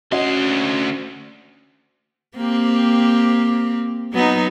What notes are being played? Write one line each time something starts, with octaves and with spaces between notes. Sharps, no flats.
D2 C#4 F#4 D#5 C6
A#3 C4 G4
F#3 B3 D#4